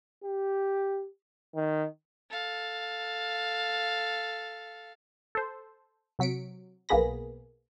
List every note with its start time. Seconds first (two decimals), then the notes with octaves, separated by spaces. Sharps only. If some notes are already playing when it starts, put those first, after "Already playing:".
0.24 G4
1.55 D#3
2.30 A4 F5
5.35 A4 C5
6.19 C3 F#3 B6 C#7 D7
6.89 B1 A#3 B3 G#4 B5 A#6